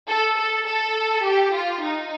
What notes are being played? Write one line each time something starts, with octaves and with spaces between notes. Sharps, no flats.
A4
A4
A4
G4
F4
D#4